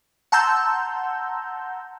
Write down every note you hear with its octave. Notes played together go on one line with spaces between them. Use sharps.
F#5 A5 A#5 C6 E6 G6